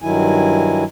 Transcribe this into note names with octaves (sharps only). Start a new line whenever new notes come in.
G2 D#3 F#3 E4 G#5